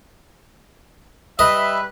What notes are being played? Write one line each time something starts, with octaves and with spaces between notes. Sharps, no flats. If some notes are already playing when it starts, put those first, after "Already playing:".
G3 B4 D#5 E5